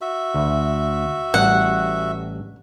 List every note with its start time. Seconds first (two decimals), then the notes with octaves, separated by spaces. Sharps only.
0.01 F#4 E5
0.34 D2
1.34 A1 G3 F#5